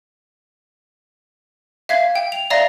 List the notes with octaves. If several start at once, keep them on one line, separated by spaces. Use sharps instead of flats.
E5 F5 G#6
G5
F7
D5 E5 F5 A#5 A#6